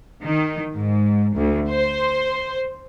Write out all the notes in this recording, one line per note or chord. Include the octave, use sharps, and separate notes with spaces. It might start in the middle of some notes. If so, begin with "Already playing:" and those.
D#3
G#2
D2
C5